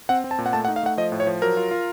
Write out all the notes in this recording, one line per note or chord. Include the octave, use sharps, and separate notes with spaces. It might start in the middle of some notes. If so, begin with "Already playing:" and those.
C4 F#5
C4
A5
A#2
F#5
A3 A5
F#5
D#4
F5
A3 F#5
F3 D#5
A2
C#5
F3
F#3 A#4
F4
F4